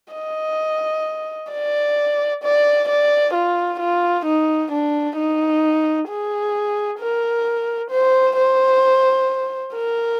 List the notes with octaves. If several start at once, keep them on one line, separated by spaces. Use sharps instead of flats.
D#5
D5
D5
D5
F4
F4
D#4
D4
D#4
G#4
A#4
C5
C5
A#4